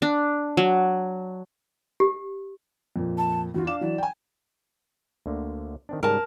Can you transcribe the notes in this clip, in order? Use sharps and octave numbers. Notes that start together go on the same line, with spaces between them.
D4
F#3
G4
F2 A#2
A5
E2 F4 F#4
D4 F5 D6 E7
E3 F#3 D5
G5 G#5
D2 D3 A#3
D#3 C4 D4
G#2 C#3 G3 A#4 A5